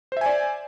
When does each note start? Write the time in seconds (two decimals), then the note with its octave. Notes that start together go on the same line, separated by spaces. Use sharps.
0.12 C5
0.17 E5
0.21 G#5
0.26 D5